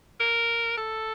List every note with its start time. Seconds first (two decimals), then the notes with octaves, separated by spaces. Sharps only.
0.20 A#4
0.77 A4